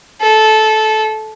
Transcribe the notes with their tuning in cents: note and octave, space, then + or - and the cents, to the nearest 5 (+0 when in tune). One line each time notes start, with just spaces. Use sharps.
A4 -15